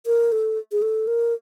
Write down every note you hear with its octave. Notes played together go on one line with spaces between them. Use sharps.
A#4
A4
G#4
A4
A#4